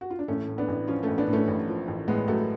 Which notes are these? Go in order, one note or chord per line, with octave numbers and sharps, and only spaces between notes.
F#4
F4
D4
A1 A3 C#4
A2
B3 D4
A1
F3 C#4 F4
A3 C#4
A1
B3 D4
A2 A3 C#4
A1
F3
A1
A2 G#3 B3
A1 F#3 A3